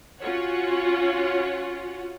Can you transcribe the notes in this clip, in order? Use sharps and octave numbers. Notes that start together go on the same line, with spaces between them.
C#4 F4 F#4 C#5 F#5